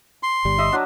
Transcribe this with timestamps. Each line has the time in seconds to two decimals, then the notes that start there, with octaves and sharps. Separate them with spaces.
0.23 C6
0.45 G1 G3
0.58 D#5 E5
0.72 F#3 D4